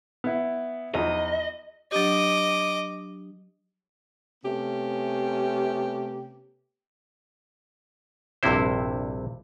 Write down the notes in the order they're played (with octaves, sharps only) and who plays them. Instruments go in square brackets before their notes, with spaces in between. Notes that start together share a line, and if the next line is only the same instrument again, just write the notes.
[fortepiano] B3 E4
[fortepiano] E2 F3 D#4 [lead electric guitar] D#5
[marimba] F#3 D4 G4 [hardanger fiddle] D#5 D6
[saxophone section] C3 A3 B3 C#4 G4
[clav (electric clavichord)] A#1 G2 C3 C4 E4 C5